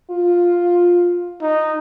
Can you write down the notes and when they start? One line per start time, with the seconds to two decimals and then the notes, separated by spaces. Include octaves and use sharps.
0.10 F4
1.42 D#4